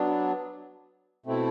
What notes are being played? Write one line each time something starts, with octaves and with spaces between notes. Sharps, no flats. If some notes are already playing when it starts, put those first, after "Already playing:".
Already playing: F#3 B3 D4
B2 A3 C4 E4